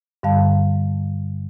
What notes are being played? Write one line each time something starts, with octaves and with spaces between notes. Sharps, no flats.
G2 D3 G3 F5 A5